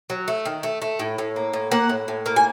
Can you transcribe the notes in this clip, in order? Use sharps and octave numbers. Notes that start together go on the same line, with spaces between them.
F#3
A3
D#3
A3
A3
A2
A2
A#3
A2
A#3 F#5
A2
A2
A#3
G#5